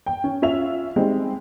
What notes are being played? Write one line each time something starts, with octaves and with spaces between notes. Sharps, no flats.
G5
C#4
C#4 F4 E5 F7
G3 G#3 C4 D#4